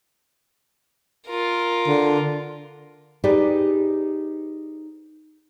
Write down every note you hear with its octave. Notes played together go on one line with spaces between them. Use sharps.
F4 A#4
D3
D#4 G4 G#4 B4 C5 D5